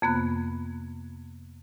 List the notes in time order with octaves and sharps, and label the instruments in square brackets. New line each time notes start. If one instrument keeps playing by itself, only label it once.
[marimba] F2 C3 A#3 B3 B5 F#6